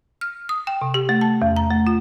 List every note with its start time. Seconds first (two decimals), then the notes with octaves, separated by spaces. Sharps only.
0.21 F6
0.49 D#6
0.67 G5
0.82 C3
0.94 G4
1.09 A3
1.21 A5
1.42 E2
1.56 A#5
1.71 A3
1.87 F4